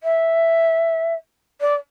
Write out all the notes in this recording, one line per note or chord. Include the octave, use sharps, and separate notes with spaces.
E5
D5